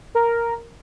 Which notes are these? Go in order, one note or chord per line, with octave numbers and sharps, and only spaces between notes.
A#4